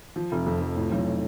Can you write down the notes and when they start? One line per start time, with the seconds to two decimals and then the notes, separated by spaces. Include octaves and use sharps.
0.16 F3
0.32 F1
0.46 F2
0.61 F1
0.76 A2
0.92 B1